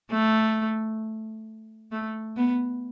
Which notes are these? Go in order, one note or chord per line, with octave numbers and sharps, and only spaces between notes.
A3
A3
B3